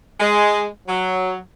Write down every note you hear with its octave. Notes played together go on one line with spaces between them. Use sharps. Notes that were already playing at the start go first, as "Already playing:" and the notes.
G#3
F#3